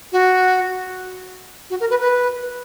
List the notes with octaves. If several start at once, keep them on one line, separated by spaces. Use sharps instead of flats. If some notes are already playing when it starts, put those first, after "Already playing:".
F#4
F#4
A#4
B4
B4